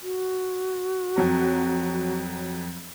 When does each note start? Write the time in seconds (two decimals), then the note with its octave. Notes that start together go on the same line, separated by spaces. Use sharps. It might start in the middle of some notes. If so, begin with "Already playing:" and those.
0.02 F#4
1.16 F2 F#3 A#5